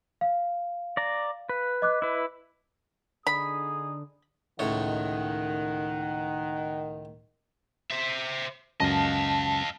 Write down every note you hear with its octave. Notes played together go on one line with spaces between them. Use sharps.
F5
D5 A#5
B4
D#5 D6 F#6
E4 B4
D3 D#4 G#4 B5 D#6
C#2 A2 D#3 C#5 F#5
C5 E5
C#2 F#2 D#5 F5 A5